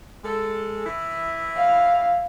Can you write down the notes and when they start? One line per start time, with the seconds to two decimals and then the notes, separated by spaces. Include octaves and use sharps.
0.24 G#3 A4
0.84 E3 E4
1.56 F5